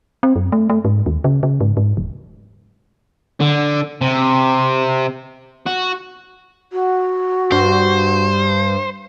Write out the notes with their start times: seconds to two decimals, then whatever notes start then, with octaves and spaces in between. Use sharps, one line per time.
0.23 C4
0.36 F#2
0.52 A3
0.70 A3
0.85 G#2
1.06 D#2
1.24 C#3
1.43 C#3
1.61 G#2
1.77 G#2
1.97 D#1
3.41 D3
4.01 C3
5.67 F#4
6.72 F#4
7.52 G2 C5